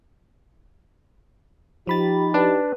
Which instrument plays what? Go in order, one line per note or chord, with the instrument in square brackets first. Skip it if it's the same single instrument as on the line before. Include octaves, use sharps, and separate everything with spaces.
[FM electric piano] F3 B5 A6 [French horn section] D#4 G4
[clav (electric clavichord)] D4 [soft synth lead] B4